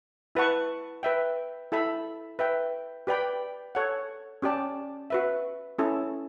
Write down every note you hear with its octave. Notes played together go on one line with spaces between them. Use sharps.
E4 B4 F#5 A5 C#6
B4 E5 G5
E4 A4 E5 B5
B4 E5 G5
G4 B4 D5 G5 B5
A4 C#5 F#5
C#4 G4 D5 A5
F#4 B4 E5
C#4 E4 A4